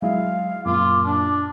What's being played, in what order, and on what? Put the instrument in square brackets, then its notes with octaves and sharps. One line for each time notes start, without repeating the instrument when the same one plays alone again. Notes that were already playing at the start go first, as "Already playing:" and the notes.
[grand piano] F#3 G#3 E4 [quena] F5
[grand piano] F#2 A#2 [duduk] F4 [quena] D6
[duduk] D4